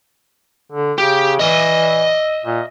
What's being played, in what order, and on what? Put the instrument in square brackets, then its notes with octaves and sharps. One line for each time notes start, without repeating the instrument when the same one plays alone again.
[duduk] D3
[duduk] C#3 [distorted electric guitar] G4
[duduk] E3 [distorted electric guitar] D#5 E5
[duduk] A#2